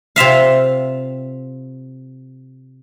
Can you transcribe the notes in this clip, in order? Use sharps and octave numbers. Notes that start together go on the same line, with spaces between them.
C3 F4 E5 F5